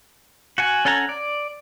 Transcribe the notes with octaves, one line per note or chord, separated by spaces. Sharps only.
F#4 F#5 G#5
C#4 A4 F#5 G#5 A#5
D5